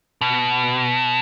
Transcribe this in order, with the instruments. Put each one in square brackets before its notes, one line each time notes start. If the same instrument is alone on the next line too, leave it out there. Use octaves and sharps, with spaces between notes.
[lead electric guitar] B2